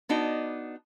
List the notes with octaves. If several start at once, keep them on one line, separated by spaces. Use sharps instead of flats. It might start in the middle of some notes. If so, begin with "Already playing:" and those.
B3 D4 D#4 F#4